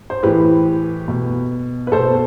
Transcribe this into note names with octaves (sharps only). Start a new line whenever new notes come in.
C5
A2 E3 G4 B4
B2
B4
B2 A4 C5